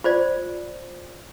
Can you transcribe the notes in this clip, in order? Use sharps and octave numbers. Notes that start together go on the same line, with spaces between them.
F4 C5 D5